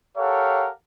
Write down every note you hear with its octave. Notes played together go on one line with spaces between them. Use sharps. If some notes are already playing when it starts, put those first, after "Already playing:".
G4 A4 A#4 C#5 F5 F#5